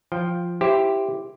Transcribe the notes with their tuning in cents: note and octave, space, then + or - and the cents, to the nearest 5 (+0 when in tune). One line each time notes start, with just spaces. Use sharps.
F3 +0 G5 +0
E4 +10 G4 +0 C5 +0